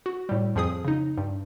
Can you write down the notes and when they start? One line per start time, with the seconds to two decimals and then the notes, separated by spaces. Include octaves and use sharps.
0.06 F#4
0.29 A2 G3
0.55 F2 F3 G#4 D#6
0.85 C#3 D#4
1.18 G2